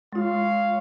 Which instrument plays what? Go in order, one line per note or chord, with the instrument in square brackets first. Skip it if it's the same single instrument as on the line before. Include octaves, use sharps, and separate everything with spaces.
[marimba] G#3 F4 [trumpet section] C#5 F5 C6